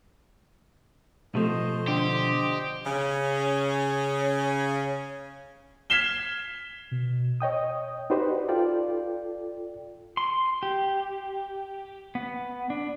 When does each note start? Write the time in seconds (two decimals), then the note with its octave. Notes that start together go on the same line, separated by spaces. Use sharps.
1.35 B2 F3 A3 C5 D#5
1.87 D3 G4
2.85 C#3 C#4
5.90 F6 G#6 B6 C7 E7 G7
6.91 B2
7.41 C#5 D#5 G5 D#6
8.10 D#4 F#4 G4 B4 C5 D5
8.49 F4 A4 D5 G5
10.17 C6
10.63 G4
12.15 B3
12.70 D4